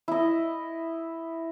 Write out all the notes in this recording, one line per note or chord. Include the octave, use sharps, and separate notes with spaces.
E4 D#5